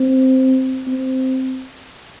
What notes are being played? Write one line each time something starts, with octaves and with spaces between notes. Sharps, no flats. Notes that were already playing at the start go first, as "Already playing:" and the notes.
Already playing: C4
C4